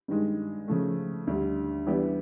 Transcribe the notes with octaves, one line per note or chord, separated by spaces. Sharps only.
G2 D#3 G#3
C#3 F3 A3
D2 D3 G3
E3 G3 B3 D4 G4